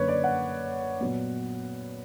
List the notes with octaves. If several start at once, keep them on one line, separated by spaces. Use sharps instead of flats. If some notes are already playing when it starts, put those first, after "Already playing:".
Already playing: F#2 D3 A#3 B4 C#5
D5
F#5
A#2 F#3 B3